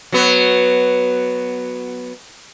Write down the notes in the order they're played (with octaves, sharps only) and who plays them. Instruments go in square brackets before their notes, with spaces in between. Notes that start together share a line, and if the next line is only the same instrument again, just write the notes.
[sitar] F#3 B3